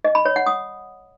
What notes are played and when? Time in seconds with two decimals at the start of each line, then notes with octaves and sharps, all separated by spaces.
0.04 D#5
0.15 B5
0.25 C#5
0.36 F#5
0.46 D#6